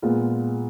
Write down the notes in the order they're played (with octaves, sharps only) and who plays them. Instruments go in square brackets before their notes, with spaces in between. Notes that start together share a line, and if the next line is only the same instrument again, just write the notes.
[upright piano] A#2 G#3 B3 F4